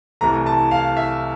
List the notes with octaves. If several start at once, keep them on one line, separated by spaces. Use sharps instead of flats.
C2 C3 E3 A3 A#5
A5
F5
E5